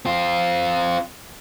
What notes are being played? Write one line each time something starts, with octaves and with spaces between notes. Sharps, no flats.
C4 F4